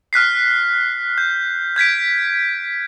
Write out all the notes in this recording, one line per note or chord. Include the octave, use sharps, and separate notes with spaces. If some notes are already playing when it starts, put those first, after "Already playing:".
F6 F#6 B6 C7
G6
G6 G#6 B6 D7